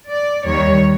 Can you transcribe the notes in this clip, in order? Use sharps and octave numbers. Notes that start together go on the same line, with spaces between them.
D5
D#2 D#3 G3 C#5